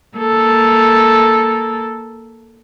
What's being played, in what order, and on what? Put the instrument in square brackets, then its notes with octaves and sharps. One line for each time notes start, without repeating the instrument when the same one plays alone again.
[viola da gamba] A#3 A4